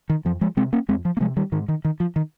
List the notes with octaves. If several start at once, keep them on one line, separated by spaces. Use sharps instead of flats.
D#3
F2 F3
F3 G#3
C3 G#3 C4
A#3 C#4
F2 G#3 C4
F3
A#3
C3 F3 G#3
D#3 G3
G#2 D#3
D#3
D#3
F3
D#3